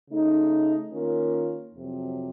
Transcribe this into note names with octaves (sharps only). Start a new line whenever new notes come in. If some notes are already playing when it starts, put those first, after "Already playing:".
C#3 A3 D#4
D#3 A#3 C#4 F4 A#4
F2 C3 F#3